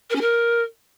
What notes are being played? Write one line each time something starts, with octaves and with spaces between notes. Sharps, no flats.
A#4
C#4
A#4